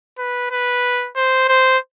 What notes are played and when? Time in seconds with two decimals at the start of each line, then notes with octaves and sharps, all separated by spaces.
0.18 B4
0.51 B4
1.16 C5
1.48 C5